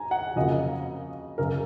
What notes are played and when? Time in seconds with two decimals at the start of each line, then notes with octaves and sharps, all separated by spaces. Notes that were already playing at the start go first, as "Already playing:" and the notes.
Already playing: G#5 A#5
0.11 F#5
0.36 F2 C#3 F#3 A#3 D#5
1.38 F#2 C#3 F#3 A#4